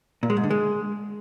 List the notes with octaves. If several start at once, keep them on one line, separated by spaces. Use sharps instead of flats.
A#2
G#3
G#2
D3
G#3